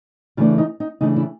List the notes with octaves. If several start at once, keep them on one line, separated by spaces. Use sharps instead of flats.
C#3 E3 A3 D4 F4
D#4
D#4
C#3 E3 A3 D4 D#4
E4